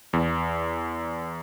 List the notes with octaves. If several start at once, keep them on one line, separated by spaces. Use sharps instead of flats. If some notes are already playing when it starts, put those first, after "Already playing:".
E2